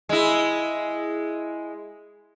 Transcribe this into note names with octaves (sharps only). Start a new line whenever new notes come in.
G#3 E4